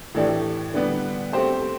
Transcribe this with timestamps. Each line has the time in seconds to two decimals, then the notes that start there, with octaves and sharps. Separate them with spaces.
0.14 A2 E3 A3 D4 G4
0.74 D3 G3 B3
1.33 A3 C4 G4 C5